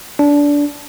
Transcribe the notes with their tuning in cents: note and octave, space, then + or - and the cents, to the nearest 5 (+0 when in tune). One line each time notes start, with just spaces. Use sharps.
D4 -20